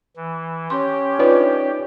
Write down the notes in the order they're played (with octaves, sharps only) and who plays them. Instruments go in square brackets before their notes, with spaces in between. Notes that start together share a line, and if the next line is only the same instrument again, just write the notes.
[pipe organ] E3
[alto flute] C#4 [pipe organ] G4 [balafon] C6
[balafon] D4 F4 B4 [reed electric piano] D#4 C#5 D5